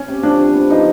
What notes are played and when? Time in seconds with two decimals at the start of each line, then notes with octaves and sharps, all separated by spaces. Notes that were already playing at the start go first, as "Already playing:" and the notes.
Already playing: C#4
0.08 C3
0.23 F3 D4
0.39 C3
0.54 B3
0.70 F3 D#4